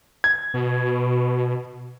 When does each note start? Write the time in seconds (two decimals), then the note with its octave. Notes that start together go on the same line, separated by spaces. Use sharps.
0.24 G#6
0.54 B2